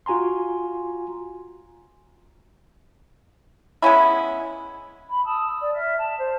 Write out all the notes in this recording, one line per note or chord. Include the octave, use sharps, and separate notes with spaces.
F4 F#4 G#5 A#5 C6
G#3 B3 C#4 E4
B5
A5 D#6 E6
D5
E5 F6
A5
C5